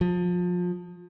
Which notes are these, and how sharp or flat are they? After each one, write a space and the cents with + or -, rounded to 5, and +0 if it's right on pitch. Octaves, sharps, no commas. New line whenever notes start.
F3 +30